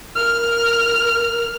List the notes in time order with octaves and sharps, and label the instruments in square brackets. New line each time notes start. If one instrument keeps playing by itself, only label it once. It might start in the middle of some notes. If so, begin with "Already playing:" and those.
[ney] A#4 [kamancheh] F6